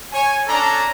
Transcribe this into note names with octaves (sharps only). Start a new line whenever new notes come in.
C#5 G#5
C#4 D4 A4 A#5